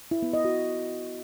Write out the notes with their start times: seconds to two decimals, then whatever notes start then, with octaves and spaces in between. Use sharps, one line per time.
0.11 E4
0.22 B3
0.34 D#5
0.45 F#4